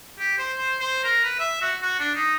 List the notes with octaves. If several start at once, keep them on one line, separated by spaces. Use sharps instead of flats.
G4
C5
C5
C5
A#4
B4
E5
F#4
F#4
D4
D#4